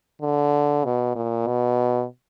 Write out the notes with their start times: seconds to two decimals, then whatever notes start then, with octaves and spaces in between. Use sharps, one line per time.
0.21 D3
0.85 B2
1.15 A#2
1.47 B2